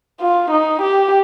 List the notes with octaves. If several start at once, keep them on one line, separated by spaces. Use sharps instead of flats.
F4
D#4
G4